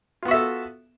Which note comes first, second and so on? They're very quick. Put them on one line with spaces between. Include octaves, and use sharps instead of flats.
F4 B3 F#4 E5 A4